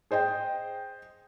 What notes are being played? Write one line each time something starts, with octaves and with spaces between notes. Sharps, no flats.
G#4 C5 D#5 G5